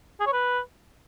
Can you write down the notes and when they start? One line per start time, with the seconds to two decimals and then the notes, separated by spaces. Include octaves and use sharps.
0.20 G#4
0.27 C#5
0.33 B4